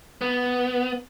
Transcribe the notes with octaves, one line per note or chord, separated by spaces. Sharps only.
B3